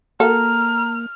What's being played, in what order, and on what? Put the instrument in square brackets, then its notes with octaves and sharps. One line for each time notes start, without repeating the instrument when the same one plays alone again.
[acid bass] A#3 [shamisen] F#4 A4 [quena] A#5 [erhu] F6